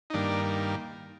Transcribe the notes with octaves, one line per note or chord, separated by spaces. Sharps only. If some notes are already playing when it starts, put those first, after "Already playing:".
D#4
G2 D#3 A#3 D4